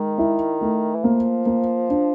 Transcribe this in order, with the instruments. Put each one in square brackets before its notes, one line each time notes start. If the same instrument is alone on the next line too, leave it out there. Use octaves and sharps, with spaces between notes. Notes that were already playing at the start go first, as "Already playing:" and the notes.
Already playing: [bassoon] D#3 [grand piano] G#3
[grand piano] E4
A3
[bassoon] E3
[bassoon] F3 [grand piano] A#3
[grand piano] A#3
D4